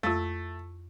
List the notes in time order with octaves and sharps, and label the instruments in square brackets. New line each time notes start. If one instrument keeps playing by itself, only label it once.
[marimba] F2 F4 [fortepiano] A3